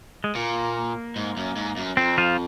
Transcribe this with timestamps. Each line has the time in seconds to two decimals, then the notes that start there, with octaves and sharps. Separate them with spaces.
0.24 G#3
0.35 A#2 A#3
1.16 G#2
1.37 F#2
1.56 G#2
1.77 F#2
1.97 F2 C4
2.18 F3 F4